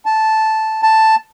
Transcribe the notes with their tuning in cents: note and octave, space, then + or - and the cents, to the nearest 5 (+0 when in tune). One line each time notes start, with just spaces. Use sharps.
A5 -5
A5 +5